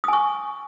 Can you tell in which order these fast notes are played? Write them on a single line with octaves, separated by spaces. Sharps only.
D#6 G#5 C#6